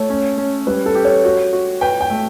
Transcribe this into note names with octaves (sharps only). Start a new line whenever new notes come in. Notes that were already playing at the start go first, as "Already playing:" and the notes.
Already playing: A3 C#5
C#4
C#4
G3 B4
A4
G4
C#5
F#4
F#4
B4 G5
G5
A3